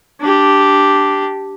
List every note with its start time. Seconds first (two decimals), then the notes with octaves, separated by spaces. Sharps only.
0.21 D4 G4